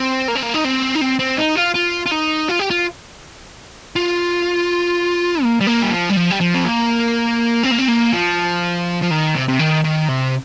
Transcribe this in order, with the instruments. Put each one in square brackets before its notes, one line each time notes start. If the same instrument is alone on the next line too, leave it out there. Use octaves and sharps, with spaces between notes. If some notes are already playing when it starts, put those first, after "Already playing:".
Already playing: [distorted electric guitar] C4
A#3
C4
A#3
D#4
C4
D#4
C4
C4
D#4
F4
F4
F4
D#4
F4
G4
F4
F4
A#3
G3
A#3
G3
F3
G3
F3
G3
F3
C4
A#3
C4
A#3
C4
A#3
F3
F3
D#3
C3
C3
D#3
D#3
C3